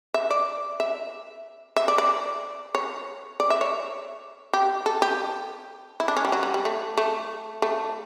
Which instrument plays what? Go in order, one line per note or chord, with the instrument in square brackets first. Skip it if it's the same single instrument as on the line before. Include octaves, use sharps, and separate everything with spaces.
[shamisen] E5
D5
E5
E5
D5
D5
C#5
D5
E5
C#5
G4
A4
G4
E4
D4
C#4
G3
F#3
G3
G3
A3
A3
A3